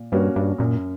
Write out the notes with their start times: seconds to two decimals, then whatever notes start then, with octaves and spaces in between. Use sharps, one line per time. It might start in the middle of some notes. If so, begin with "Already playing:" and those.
Already playing: A#2
0.12 G2 A#3 C#4 F#4
0.36 G2
0.58 F#2 A#2